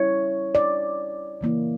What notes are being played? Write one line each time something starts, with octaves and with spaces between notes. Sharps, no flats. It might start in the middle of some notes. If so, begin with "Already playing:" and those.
Already playing: G3 C#4 E4 C#5
D5
C#3 E3 A#3 E4